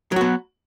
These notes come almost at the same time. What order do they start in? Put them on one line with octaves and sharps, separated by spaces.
F#3 F#4 B3